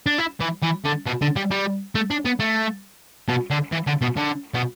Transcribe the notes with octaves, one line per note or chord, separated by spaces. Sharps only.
D4
E4
E3
E3
D3
B2
D3
G3
G3
A3
D4
B3
A3
B2
D3
E3
D3
B2
D3
B2